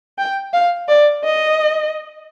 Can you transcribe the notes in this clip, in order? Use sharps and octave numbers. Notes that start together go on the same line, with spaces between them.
G5
F5
D5
D#5